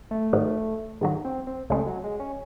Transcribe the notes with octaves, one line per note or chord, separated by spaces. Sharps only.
A3
G#2 D#3 F#3
G#2 D#3 F#3
C4
C4
C#2 C#3 G#3 A3
F#3
G#3
C#4